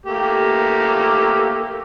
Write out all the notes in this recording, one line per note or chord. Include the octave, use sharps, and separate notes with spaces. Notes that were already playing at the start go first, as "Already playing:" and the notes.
A3 A#3 G4